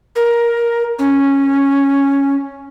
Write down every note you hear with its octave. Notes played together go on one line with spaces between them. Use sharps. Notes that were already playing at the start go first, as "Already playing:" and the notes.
A#4
C#4